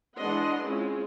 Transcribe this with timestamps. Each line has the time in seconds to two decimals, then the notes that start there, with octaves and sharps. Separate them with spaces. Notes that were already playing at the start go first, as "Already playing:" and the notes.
0.17 E3 G#3 D4 D#5 F#5 C6
0.63 G#3 C4 C#4 E4 F4